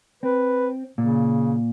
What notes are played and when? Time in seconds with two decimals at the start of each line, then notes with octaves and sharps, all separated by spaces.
0.23 C4 B4
0.98 A#2 C#3